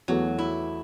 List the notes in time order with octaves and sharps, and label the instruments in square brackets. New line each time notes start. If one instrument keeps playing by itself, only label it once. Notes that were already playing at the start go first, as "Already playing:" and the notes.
[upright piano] E2 E3 A3 F#4 [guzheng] F#3
[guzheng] E4